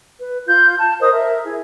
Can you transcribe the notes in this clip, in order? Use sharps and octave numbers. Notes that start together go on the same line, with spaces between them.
B4
F4 G6
A5
A#4 C5 D#5 D#6
A#4 E5
E4 G#4